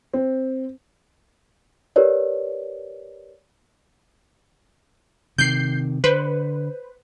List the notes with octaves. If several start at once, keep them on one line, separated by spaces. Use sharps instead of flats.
C4
G4 A#4 B4 C#5 D5
C3 D#3 G6 C7
D3 B4 C5